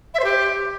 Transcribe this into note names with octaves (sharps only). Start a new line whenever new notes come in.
E5
C5
G4